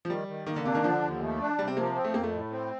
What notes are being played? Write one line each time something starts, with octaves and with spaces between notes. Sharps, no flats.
F3
D#3 G3
D#3
D#3 A#3
D3
C3 D4
D#3
D3 F3
D#2
A3
D4
C3 G3
C4
F3 A#3
C4
A3
F2 A#3
A3
A2
C4